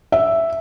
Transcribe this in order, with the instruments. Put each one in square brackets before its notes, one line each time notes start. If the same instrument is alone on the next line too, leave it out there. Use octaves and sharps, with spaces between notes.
[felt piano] E5